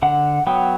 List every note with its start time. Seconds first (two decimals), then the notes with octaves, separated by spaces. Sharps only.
0.02 D3 F#5
0.47 F#3 B3 G5